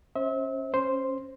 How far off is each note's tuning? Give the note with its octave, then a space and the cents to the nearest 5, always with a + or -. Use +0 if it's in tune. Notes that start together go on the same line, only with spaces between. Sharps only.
C#4 -15 C5 +25 E5 -35
C#4 -15 C5 +0